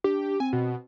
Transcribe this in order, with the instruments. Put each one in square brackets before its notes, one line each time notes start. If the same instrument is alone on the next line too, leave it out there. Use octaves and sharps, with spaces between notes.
[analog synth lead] D4 [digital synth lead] G4
[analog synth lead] C4 [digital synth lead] G#5
[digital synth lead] B2